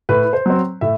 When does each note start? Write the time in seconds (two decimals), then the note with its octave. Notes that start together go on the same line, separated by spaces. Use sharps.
0.09 A2 B4
0.33 C5
0.46 F#3 C4
0.81 A2 E5